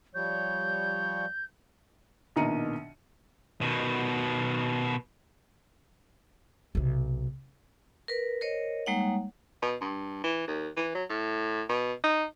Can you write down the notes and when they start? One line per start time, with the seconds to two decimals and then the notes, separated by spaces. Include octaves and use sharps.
0.15 F3 G3 C#5 G6
2.36 A#1 B2 D#3 A#5 C#7 D#7
3.61 B2 D#3
6.75 B1 C3
8.08 A#4 B4
8.41 A#4 C5 C#5 D#5
8.86 G3 G#3 A#3 D#4 C#5 F#5
9.62 B2
9.81 G2
10.24 E3
10.47 D#2
10.77 E3
10.95 F#3
11.10 A2
11.69 B2
12.04 D#4